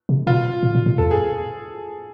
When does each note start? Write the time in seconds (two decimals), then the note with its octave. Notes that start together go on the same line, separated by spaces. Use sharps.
0.09 C3
0.27 B2 F4
0.63 A#2
0.75 A#2
0.86 A#2
0.98 E2 A4
1.11 G#4